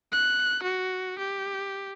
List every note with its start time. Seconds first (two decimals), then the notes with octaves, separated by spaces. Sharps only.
0.12 F#6
0.63 F#4
1.18 G4